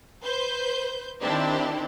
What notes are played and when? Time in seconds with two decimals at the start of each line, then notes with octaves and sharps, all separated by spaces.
0.23 B4 C5 G6
1.21 D#3 C4 D4 E4 G4